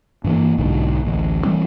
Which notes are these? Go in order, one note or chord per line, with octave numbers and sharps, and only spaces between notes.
G2 E3 A#3
B1 G#2 D3
A1 D2
E3 G3 C4